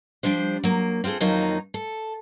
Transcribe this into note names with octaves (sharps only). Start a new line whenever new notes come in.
F3 G3 D4 C5
F#3 A#3
C4 F4 F#4 G#4 A4
F2 D#3 F#3 A#3 D#4 F4
A4